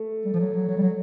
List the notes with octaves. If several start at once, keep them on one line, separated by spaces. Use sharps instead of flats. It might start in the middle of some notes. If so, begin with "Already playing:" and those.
Already playing: A3
G3
F3
F#3
F#3
F#3
G3
F#3